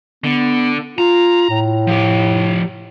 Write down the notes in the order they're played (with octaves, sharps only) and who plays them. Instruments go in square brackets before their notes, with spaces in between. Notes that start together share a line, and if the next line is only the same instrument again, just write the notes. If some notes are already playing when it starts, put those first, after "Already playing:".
[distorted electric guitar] D3 [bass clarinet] B3
[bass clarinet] F4 [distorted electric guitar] A#5
[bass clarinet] A2
[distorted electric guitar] F3 G4